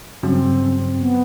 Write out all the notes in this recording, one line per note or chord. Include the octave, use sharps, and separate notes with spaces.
G2 C#3 F#3 C4
B3